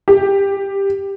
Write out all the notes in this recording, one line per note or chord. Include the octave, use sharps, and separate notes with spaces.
G4